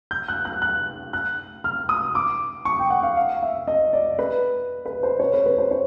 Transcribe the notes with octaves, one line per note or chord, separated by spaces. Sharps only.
G6
F#6
F#6
F#6
F#6
F6
D#6
D6
C#6
G5
F#5
F5
F5
E5
D#5
D5
B4
B4
C5
C#5
B4
B4
C5
C#5